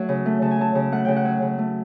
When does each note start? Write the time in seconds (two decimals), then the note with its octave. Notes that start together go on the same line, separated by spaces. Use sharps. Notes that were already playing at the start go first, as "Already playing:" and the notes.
Already playing: F#3 A3
0.09 C#3
0.26 A3
0.42 C#3 A5
0.51 G#5
0.59 F#3 A5
0.75 C#3
0.92 A3 F#5
1.05 C#3 G5
1.16 F#5
1.25 F#3
1.42 C#3
1.59 A3